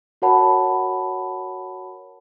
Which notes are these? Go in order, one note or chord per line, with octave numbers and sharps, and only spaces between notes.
F#4 A#4 C#5 F#5 A5 B5